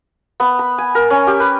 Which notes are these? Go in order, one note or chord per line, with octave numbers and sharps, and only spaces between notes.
B3
B5
G#5
A#4
C#4
G4
B4